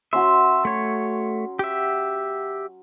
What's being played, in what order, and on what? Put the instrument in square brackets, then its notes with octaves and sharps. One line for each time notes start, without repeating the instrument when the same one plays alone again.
[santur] F#3 C#4 C6 [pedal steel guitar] E5
[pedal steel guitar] A3 C#5
G4 E5